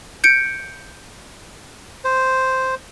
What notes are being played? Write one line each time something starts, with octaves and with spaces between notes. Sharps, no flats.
G6 C#7 D7
C5